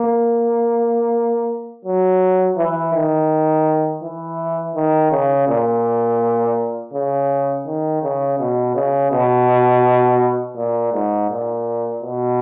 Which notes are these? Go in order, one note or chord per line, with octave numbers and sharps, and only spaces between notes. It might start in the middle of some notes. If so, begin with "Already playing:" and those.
Already playing: A#3
F#3
E3
D#3
E3
D#3
C#3
A#2
C#3
D#3
C#3
B2
C#3
B2
A#2
G#2
A#2
B2